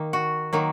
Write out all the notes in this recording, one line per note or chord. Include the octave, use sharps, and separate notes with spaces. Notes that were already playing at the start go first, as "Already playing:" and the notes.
Already playing: D#3 A#3
F#4
D#3 F#3 A#3